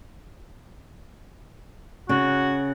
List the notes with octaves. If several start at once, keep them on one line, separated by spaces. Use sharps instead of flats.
C#3 F#4